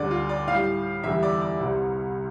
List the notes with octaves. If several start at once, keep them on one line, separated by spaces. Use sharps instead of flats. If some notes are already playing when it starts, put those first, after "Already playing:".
Already playing: D2 D3 G3 D5
F4
D5
A2 G3 F5
E2 D3 G3 E5
D5
D5
C2 C3 G3